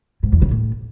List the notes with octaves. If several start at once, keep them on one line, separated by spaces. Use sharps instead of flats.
G#2
E2
C#3
A2